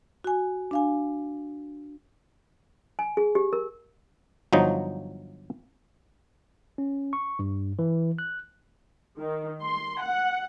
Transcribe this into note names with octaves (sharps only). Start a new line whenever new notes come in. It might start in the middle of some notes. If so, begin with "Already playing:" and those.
F#4 G#5
D4 F5 G#5
G#5
G#4
G4
A#4
G1 F3 F#3 D#4
C#4
C#6
G2
E3
F#6
D#3
C6
F#5